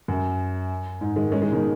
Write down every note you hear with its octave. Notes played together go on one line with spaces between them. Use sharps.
F#2
G#2
D#3 G#3
G#3 C#4
D#3 G#3
B2 D#3